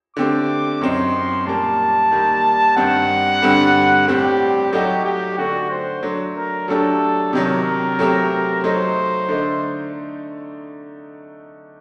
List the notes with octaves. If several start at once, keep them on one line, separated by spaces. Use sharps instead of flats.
D3 A3 C4 G4 D6
F#2 F#3 C4 D#4 C6
A#2 G3 A#3 A5
D#3 G3 A#3
G2 D#3 G3 C4 F#5
G2 D3 G3 C4
A2 G3 C4 G4
F#3 A3 D#4 F#4 G4
G4
D3 A3 D4 F#4
C5
F#3 A3 D4
A#4
F#3 A3 D4 G4 A4
C3 D#3 F#3 A#4
F#3 A3 C4 G4
F#3 A3 D#4 C5
D3 A3 D#4